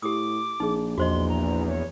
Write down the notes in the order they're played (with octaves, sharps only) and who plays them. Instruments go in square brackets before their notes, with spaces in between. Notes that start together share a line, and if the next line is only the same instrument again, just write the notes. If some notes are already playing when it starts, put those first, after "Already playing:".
[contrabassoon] A2 [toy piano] G4 D#6 [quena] D6
[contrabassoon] A#1 [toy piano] D#4 G#4
[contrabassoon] A#1 [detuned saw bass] E2 [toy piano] F#4 C5 D#5 [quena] C6
[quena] A#5
[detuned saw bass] E2 [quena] C#5